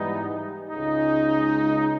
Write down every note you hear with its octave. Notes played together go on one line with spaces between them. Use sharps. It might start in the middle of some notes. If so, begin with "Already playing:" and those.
Already playing: G#2 E3 G3 B3 D#4
C#2 C#3 G#3 D#4